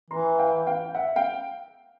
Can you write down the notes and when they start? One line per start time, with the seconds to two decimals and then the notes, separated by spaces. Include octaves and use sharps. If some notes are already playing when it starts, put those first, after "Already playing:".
0.10 E3 A#5 C6
0.39 F5 G5
0.67 F5 G5
0.95 E5 F#5
1.16 F5 G5